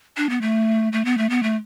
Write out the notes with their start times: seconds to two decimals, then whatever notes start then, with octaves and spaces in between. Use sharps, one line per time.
0.17 D4
0.30 B3
0.41 A3
0.93 A3
1.05 B3
1.18 A3
1.30 B3
1.43 A3